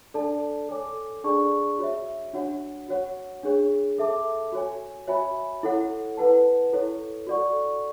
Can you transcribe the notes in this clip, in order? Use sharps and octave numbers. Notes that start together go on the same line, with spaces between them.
D4 A4 D5 A5
A4 C#5 G#5 D6
D4 G#4 D5 A5 C#6
F#4 C#5 E5
D4 F#4 C#5 F#5
F#4 C#5 F#5
D4 G#4 C#5
A4 E5 A5 D6
F#4 C#5 G#5
F#4 C#5 E5 G#5 B5
E4 A4 C#5 F#5
E4 B4 F#5 A5
E4 A4 C#5
F#4 A4 D5 F#5 C#6